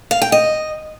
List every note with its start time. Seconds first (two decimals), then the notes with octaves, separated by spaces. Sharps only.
0.11 F5
0.22 G5
0.32 D#5